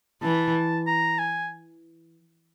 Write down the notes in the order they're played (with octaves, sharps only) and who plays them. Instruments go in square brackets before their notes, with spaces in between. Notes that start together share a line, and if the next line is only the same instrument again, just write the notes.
[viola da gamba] E3 [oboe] A5
[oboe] A#5
G#5